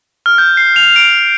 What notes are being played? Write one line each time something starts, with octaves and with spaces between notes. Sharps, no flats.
F6
G6
C7
F7
D7